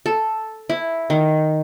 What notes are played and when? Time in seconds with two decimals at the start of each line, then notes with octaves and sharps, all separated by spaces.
0.06 A4
0.70 E4
1.10 D#3